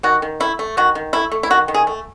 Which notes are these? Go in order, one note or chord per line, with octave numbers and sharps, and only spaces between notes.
D#3 F#4
D#3
A3 E4
A3
D#3 F#4
D#3
A3 E4
A3
E4
D#3 F#4
D#3
G#4
A3